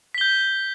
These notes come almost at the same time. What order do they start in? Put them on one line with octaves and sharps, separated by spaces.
B6 G7 G6